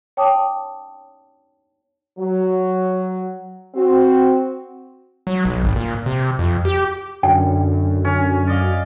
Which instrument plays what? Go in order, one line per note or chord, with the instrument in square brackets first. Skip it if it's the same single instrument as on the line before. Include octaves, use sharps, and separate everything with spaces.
[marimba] C#5 G5 A5 D6 D#6
[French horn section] F#3
C4 F#4
[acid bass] F#3
B1
G#1
A#2
C3
F2
G4
[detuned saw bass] F#2 [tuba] D3 [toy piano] G5
[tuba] D3 [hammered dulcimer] C#4
[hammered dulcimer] D5 D#5 F5